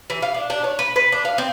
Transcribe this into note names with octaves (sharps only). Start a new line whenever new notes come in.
E3
F5
D4
D4
C#5
B4
B4
D4
F5
C4